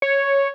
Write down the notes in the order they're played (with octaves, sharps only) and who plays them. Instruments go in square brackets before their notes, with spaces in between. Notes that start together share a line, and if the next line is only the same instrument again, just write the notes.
[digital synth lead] C#5